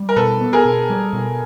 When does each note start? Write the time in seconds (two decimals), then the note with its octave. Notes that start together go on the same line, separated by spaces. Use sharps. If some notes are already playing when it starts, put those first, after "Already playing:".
Already playing: G3
0.09 A#4
0.16 B2 A4 B4
0.41 B3
0.53 G#4 A#4
0.65 B2
0.90 G3
1.13 B2